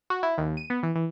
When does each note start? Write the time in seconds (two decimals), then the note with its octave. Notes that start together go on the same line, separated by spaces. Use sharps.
0.10 F#4
0.23 E4
0.38 D#2
0.57 D#7
0.70 B3
0.83 E3
0.95 E3